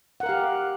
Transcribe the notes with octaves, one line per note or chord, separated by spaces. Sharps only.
G4 A#4 F5 F#5